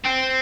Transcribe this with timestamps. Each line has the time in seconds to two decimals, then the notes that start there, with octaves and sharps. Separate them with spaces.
0.04 C4